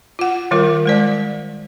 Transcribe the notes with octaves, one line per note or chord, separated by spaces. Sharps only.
F4 F#5
D#3 G3 F4 A#4
G#3 C5 D5